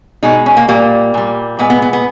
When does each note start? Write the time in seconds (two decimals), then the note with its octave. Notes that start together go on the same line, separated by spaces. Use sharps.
0.23 B2 G#3 D#4
0.46 C#4
0.57 A#3
0.68 A#2 G3 A#3
1.14 A#2 G3
1.59 A#2 G#3 B3
1.70 B3
1.82 B3
1.93 B3